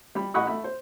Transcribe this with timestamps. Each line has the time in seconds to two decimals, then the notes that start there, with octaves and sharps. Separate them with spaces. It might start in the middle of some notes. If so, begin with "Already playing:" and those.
0.15 G3 B5
0.34 A1 D#5 F#5 B5 C#6 D#6
0.47 A3 B5
0.64 C5